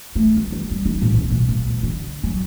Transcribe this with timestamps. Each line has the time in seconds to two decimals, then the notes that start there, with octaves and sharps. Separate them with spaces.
0.16 A3
0.37 D#3
0.52 D#3
0.71 G3
0.86 D#4
1.02 A2
1.14 C#2
1.30 B1
1.49 A#2
1.67 D2
1.83 D3
2.23 F#3